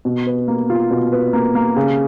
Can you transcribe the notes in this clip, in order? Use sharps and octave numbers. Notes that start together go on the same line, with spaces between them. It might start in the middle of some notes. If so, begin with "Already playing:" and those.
B2
B4
A#3
F4
B2
B4
A#3
A#3
C#3